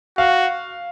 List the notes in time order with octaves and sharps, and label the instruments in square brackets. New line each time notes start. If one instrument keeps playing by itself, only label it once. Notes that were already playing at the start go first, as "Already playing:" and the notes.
[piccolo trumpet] F#4 [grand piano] F5